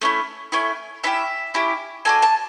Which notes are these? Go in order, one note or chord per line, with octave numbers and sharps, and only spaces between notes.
A3 C#4 E4
A3 C#4 E4
C#4 E4 G4 E5
C#4 E4 G4
D4 F#4 A4 G#5
A5